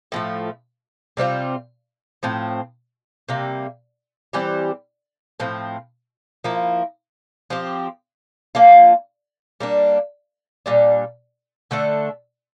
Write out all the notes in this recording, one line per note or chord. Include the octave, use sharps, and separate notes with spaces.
A2 F3 A3
C3 G3 C4 F4
A2 F3 C4
C3 G3 A#3
E3 G3 C4 G4
A2 F3 C4
F3 A#3 E4
F3 C4 G4
F3 A#3 D4 F4
G3 A#3 D4
A#2 G3 D4
D3 A3 D4 A4